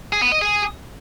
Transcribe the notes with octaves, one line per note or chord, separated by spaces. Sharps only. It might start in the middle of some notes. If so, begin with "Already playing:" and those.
G#4
B3
D#5
G#4